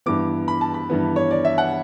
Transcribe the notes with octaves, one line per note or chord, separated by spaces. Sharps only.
G2 E3 B3 D6
B5
A5
B5
G2 E3 B3
C#5
D5
E5
F#5